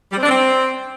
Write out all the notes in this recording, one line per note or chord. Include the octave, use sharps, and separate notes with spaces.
G3
C4
D4
C4